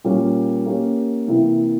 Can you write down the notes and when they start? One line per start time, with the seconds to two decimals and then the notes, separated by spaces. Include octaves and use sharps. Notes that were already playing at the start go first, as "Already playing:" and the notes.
0.04 A#2 G3 A#3 C#4
0.66 A#3 C#4 G4
1.28 C3 E3 A#3 E4